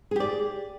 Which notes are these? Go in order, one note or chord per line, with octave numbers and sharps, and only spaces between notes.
G4 G#4 D5